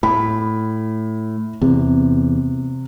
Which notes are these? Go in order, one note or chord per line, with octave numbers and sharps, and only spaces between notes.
A2 B5
E2 C3